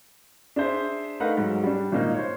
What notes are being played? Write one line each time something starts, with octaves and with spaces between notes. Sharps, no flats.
D4 G#4 C5 E5
A3 D#4 A#4 B4 F5 F#5
G#2 F#3
G3 D4
G#1 A#2 A#3 D#4
C5 C#5